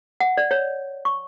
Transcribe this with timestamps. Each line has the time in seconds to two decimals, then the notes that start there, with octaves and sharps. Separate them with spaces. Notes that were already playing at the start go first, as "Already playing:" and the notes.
0.20 F#5
0.37 D5
0.51 C#5
1.05 C#6